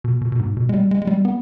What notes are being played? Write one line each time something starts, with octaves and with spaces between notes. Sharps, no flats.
B2
B2
B2
G#2
B2
G#3
G3
G#3
G#3
G3
B3